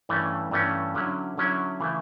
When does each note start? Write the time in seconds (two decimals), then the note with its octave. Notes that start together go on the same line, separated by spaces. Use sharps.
0.09 G2 E3 A3 C#4
0.51 G2 E3 A3 C#4
0.94 D3 F#3 C#4 E4
1.37 D3 F#3 C#4 E4
1.80 C#3 E3 A3 E4